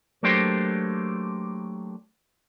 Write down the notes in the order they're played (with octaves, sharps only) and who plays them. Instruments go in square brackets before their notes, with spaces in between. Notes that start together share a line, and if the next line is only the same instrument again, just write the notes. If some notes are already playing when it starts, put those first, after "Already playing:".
[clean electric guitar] F#3 A3 A#3 D4 G4 C5